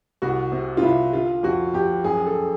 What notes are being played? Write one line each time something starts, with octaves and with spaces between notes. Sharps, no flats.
C2 F#4
C3
F4
C2 E4
D3 F4
F2 F#4
F2 G4
F#2 G#4
A4